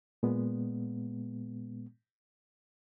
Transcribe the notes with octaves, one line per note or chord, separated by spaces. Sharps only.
A#2 G#3 B3